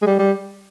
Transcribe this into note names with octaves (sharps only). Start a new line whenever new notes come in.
G#3
G3
G3